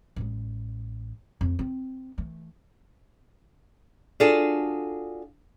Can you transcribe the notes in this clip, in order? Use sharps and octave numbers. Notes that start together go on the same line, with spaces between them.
A1 G#3
F2 A3
C4
E3 A3
D4 F4 F#4 G#4 A4